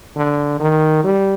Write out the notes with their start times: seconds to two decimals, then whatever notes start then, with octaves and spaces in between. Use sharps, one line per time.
0.16 D3
0.60 D#3
1.04 G3